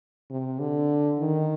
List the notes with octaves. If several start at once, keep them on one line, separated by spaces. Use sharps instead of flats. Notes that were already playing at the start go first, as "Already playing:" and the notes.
C3
D3
D#3